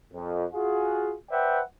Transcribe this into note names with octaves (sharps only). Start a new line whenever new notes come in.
F2
F4 F#4 G#4
B4 C5 D5 E5 F#5 G5